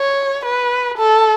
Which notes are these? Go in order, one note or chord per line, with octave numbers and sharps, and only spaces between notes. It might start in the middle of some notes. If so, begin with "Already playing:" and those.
Already playing: C#5
B4
A4